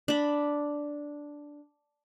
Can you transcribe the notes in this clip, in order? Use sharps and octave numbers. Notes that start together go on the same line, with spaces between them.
D4 B5